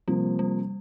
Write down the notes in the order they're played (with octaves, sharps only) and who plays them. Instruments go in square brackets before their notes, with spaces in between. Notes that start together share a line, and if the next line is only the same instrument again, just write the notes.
[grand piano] C3 F3 A#3 [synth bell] G3
[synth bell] G3